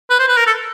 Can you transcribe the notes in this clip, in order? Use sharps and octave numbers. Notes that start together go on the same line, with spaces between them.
B4
C5
B4
A#4
A4